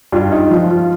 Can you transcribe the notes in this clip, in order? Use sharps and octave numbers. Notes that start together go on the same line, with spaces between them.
G2 F4
D#4
F3 F4
F4